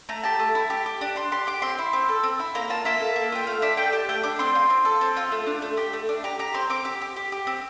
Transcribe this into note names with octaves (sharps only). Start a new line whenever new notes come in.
A3 A#5
G4 A5
A3
E4
G4
G4
D4
D4 C6
G4 C6
G4 D6
C4 C6
E4
C4
A4
C4
E4
A#3 A#5
F4 A5
A#3 E5
A4
A#3
F4 G5
A3 F5
D4 E5
A3 G5
G4 A5
A3 G5
D4 D6
C4 C6
F4
C4
A4
C4
F4
A3
D4
A3
G4
A3
D4
G4 A#5
G4 A#5
C4 C6
C4 D6
G4
G4
G4
G4
C4